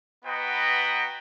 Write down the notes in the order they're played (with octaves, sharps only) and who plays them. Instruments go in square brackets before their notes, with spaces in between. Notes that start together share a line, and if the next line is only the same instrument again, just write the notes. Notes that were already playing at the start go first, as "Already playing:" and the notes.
[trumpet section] B3 F#4 B4 D#5 G5 A#5